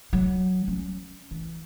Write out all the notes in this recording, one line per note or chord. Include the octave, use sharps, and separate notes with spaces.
F#3
C#4
E3